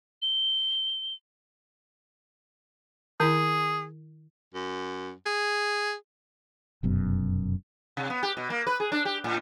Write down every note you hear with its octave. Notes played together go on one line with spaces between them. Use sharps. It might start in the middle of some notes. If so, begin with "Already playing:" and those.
G7
D#3 E4 G#4
F#2
G#4
F1 F#2 B2
C3
B3
G4
B2
A#3
B4
G#4
D4
G4
A2